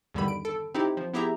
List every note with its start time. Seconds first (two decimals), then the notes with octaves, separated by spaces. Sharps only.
0.14 E2 G2 D3 D#3 G3 B5
0.28 D7
0.45 A4
0.74 C4 D#4 E4 G4
0.97 F3
1.14 B3 E4 G4 G#4 E5 A#5